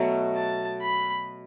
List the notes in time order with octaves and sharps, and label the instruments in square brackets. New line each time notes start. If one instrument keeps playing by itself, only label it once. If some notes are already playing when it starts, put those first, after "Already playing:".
Already playing: [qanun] B2 F#3 A3
[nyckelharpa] A5
B5